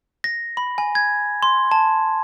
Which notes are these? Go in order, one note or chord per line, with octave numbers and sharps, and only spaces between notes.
A#6
B5
G#5
G#6
C6
A5